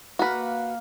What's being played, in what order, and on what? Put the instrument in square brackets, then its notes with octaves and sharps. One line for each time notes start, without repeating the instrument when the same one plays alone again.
[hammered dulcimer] A#3 F5 [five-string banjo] F#4 B4